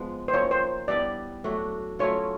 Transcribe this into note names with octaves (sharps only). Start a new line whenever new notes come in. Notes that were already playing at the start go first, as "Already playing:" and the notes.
Already playing: F3 G#3 B3
C5
F3 A#3 D#4 C#5
C5
G3 B3 E4 G4 D5
F#3 A3 D4 F#4
F#3 A3 C#4 F4 C#5